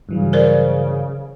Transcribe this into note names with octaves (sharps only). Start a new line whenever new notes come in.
G2 C#3 E3 F#3
A#4 C5 D5